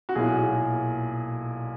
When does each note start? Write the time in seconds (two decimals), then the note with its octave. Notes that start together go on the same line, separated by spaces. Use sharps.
0.09 F#4
0.15 B1 A#2 A#3 E4 G#4